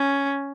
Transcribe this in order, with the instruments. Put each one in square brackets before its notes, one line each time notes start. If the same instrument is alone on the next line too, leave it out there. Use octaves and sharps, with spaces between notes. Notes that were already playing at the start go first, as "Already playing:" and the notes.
Already playing: [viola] C#4